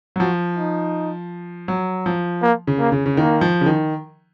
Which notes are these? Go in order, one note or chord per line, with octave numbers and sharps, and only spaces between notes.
F#3
F3 F#4
D#4
F#3
F3
A#3
C#3
A#3
C#3
C#3
D#3 A#3
F3
C#3
D#3